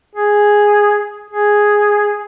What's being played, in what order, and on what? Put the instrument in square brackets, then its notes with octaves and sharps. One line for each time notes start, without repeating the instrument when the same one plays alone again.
[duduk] G#4
G#4